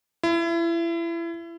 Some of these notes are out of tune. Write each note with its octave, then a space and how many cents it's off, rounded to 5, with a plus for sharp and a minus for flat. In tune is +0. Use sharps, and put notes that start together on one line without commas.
E4 +30